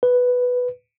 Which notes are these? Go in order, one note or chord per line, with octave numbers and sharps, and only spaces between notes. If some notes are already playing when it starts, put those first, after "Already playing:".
B4